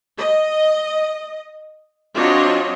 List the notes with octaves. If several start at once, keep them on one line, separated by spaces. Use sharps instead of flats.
D#5
F#3 C4 D4 F4 C#5 D#5